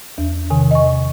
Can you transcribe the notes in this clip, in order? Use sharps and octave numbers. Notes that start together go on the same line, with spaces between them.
E2
C3 D#3 G#5
D#5 C#6